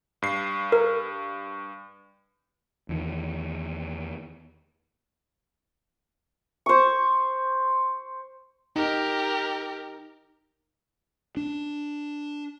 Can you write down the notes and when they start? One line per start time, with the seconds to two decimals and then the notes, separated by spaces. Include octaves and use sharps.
0.22 G2 C7
0.72 A#4
2.89 E2 D#3
6.66 C5 C#6
8.76 D#4 G4 A#4
11.37 D4